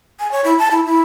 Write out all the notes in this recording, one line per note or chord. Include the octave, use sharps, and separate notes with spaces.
G#5
C#5
E4
A5
E4
E4